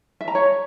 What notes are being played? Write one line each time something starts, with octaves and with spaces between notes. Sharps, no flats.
E5
A#5
C#5